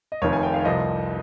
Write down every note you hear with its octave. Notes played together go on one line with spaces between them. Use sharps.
D#5
F1 F2 D#3 C#5
G#5
G5
F5
C2 C3 F3 D#5